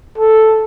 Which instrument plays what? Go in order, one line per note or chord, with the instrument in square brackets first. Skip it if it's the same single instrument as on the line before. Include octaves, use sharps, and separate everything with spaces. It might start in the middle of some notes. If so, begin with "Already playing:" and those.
[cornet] A4